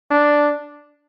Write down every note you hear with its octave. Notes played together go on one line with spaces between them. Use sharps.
D4